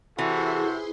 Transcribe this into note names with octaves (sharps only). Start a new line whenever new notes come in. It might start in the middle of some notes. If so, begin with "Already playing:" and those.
C3 E3 E4 F#4 G#4 A4 C6